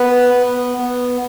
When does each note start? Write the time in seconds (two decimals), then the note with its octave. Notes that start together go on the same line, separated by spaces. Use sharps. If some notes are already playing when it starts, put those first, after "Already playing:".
Already playing: B3 B4
0.34 B3
0.78 B3